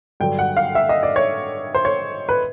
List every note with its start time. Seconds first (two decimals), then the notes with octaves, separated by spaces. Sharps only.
0.20 G2 D3 F#3 G5
0.39 F#5
0.57 F5
0.75 E5
0.89 D#5
1.03 D5
1.16 C#5
1.75 C5
1.85 C#5
2.29 B4